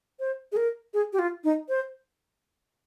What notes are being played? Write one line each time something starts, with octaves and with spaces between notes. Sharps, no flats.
C5
G#4
A#4
G#4
G4
F4
D#4
C5